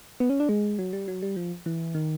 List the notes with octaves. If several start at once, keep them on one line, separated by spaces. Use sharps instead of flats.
B3
C#4
D4
G#3
F#3
G3
F#3
G3
F3
E3
D#3